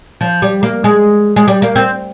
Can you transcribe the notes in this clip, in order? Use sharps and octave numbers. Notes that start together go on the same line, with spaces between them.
F3
G3
A#3
G#3
G#3
G3
A#3
C4